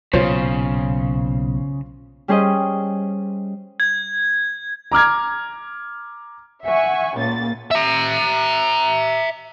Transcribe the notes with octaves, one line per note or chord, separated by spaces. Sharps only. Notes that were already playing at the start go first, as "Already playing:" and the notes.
B1 A#2 C#3 F4 C5 C#5
G3 C#4 G#4 C5 D#5
G#6
A#5 D6 F6 G#6
E5 F#5 G#5 C#6
C#2 A#2 A#3 A6
E5 A#5